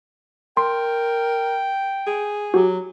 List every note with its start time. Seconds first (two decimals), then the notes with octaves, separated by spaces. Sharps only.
0.57 A#4 G5 C6
2.07 G#4
2.54 F#3 F#4 G4